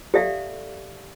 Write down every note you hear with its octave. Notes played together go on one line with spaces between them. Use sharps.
G4 A4 D5 E5 F5